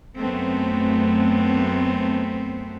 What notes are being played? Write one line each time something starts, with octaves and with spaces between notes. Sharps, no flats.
F#2 A3 B3 C4